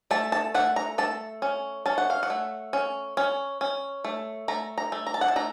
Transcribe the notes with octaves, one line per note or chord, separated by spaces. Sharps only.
A3 A5
A5
A3 F#5
A#5
A3 A5
C#4
C#4 A5
F#5
F5
F#5
A3
C#4
C#4
C#4
A3
A3 A#5
A#5
A3
A#5
A5
F#5
A5
A3 A#5